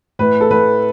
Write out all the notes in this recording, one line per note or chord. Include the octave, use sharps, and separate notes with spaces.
A2 B4
A4
A2 B4